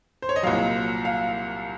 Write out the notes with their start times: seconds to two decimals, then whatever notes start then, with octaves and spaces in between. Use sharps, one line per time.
0.22 C5
0.29 C#5
0.36 D#5
0.43 C2 A#2 F#3 F5
1.05 F5